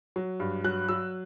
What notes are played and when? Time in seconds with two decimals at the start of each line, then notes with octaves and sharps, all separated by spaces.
0.16 F#3
0.40 G2
0.64 F#3 F#6
0.89 F#3 E6